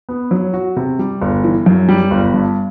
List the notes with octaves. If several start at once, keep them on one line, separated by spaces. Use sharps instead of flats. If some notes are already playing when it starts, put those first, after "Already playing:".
B3
F#3
F#4
C3
G3
G1
E3
F#2
G3
G1
G2